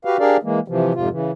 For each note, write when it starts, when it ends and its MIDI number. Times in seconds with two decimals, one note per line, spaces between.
0.05 0.17 66
0.05 0.17 67
0.05 0.17 71
0.05 0.17 77
0.19 0.37 62
0.19 0.37 67
0.19 0.37 68
0.19 0.37 70
0.19 0.37 74
0.19 0.37 77
0.43 0.60 52
0.43 0.60 56
0.43 0.60 58
0.68 0.93 48
0.68 0.93 52
0.68 0.93 53
0.95 1.09 41
0.95 1.09 44
0.95 1.09 48
0.95 1.09 65
1.10 1.32 49
1.10 1.32 52